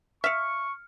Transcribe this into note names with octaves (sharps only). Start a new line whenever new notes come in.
E5 F5 C#6 F6 C#7